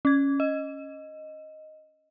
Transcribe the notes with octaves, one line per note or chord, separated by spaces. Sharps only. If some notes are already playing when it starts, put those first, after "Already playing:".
C#4 G#6
D#5